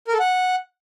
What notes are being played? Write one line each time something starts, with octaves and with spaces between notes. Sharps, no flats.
A#4
A4
F#5